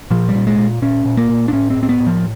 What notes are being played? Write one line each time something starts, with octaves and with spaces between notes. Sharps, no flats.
A#2 F3
G3
A#2
G#3
A#2
A#2 C#4
A#2
A#3
A#2
D4
A2 C#4
C4
A2
C4
B3
A2
F3